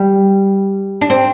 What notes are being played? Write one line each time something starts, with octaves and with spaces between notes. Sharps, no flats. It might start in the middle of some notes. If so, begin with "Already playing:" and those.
Already playing: G3
D4
C4